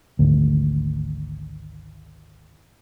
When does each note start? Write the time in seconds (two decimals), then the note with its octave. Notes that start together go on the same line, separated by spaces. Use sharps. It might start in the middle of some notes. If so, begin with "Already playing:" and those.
0.19 G#1 D2